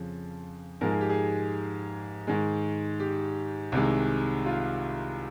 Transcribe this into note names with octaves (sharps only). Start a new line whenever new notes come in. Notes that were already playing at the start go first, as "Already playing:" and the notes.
Already playing: F2 C#3 F3
G#2 F3 G#3 A#4
G#4
G4
G#4
G#2 D#3 G#3
G4
C2 C3 D#3 G#3
F4